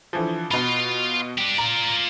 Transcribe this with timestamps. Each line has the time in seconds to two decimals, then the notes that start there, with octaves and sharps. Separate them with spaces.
0.13 D3 E3 F3
0.51 B2 F4 B5
1.38 D4 G4
1.58 F4 D5 A#5